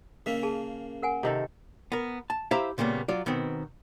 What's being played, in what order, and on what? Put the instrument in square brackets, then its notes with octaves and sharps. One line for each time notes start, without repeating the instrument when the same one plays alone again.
[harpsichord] C#3 A#3 [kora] E5
[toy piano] G#4 A5
A#4 F#5 G#5
[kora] C3 D#3 A4
[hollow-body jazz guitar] B3 A#4
A5
E4 G4 C5 E5 F5 A#5
A#2 C#3 G3 A#3 B3
F#3 F4 D5
B2 D#3 B3 C4